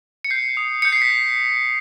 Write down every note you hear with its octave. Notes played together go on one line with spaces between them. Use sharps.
C#7
G6 C7
D#6
G6 C#7
C7
B6